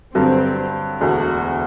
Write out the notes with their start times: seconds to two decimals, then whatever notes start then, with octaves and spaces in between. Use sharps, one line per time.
0.15 G2 D3 F#3 C4
1.01 E1 D2 D3 F#4